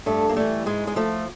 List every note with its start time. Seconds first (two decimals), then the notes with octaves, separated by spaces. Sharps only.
0.06 G2 A3
0.29 A#3
0.36 E3 G3 A3
0.66 G#2 G#3
0.87 G#3
0.96 F3 A3